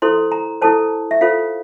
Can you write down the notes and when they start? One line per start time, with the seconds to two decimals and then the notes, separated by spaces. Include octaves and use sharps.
0.02 E4 A4 C5 C6
0.32 A#5
0.62 E4 A4 C5 A5
1.11 E5
1.21 F4 A4 C5 F5